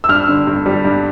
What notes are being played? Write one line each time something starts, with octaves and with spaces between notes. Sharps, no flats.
E6
G2 F6
D3
G2
G3
G2